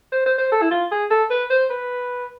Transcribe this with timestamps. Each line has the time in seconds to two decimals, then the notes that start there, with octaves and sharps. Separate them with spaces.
0.12 C5
0.26 C5
0.38 C5
0.52 A4
0.62 E4
0.71 F4
0.91 G#4
1.11 A4
1.30 B4
1.50 C5
1.70 B4